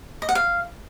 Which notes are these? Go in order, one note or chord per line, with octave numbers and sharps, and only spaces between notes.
D#5
F#5
F5